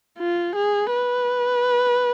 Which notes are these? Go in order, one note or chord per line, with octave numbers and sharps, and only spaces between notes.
F4
G#4
B4